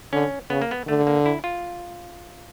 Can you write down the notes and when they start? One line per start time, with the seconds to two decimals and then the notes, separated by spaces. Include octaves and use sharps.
0.13 D3 C#4
0.50 C#3 B3
0.62 A#3
0.71 B3
0.87 D3 A3
1.07 A#3
1.26 E4
1.44 F4